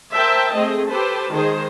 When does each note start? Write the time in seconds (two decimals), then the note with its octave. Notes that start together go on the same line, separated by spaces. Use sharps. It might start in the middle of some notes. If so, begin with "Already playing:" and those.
0.14 A#4 C5 E5 G5 A5
0.54 A3 C4 G#4 D#5
0.88 G4 A4 B4 C5 A5
1.33 D#3 G#3 G#4 C5